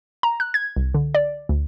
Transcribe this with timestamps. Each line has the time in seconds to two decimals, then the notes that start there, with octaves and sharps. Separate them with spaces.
0.23 A#5
0.40 F#6
0.54 G#6
0.76 C2
0.94 D3
1.15 D5
1.49 D2